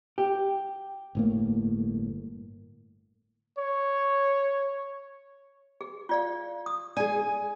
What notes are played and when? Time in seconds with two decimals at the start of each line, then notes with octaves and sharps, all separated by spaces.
0.18 G4
1.15 G1 A2 A#3
3.58 C#5
5.81 G#4
6.09 F4 D5 F5
6.66 D#6
6.97 G#4 D5 G#5